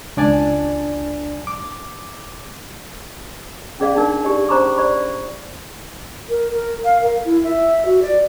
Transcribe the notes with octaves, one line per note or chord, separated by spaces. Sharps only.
C#2 D4 D5 G#5 A5
D6
C#4 G#4 D5 F5
D4 D#4 A#4
G4 D5
C#4 C5 A#5 B5 C#6 D6
C5 D5 B5 C#6
A#4
A#4
F5
A#4
E4
E5
F#4
D5